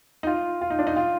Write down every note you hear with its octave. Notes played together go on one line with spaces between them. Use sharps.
D#4
F4
F4
D#4
D4
D#4
F4